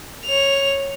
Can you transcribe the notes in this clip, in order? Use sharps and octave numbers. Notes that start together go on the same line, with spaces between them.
C#5 F7